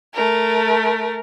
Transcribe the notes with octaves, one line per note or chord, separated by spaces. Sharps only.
A3 A#4